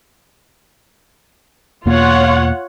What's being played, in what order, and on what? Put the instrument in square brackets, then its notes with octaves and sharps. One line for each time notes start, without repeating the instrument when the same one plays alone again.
[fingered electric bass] E2 B2 A#3 [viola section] F4 C#5 F#5